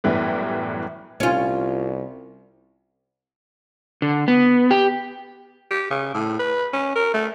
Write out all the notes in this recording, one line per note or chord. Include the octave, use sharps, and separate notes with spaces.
F#2 A2 E3 G3 B3
C2 C#4 F4
D3
B3
G4
G4
C#3
A2
B4
C#4
A#4
A3